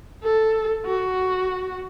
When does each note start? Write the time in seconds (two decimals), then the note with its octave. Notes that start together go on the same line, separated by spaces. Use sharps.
0.23 A4
0.85 F#4